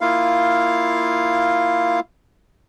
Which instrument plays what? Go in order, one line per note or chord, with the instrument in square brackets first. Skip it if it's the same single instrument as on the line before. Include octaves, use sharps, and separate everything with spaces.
[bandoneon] A#3 E4 F4 F5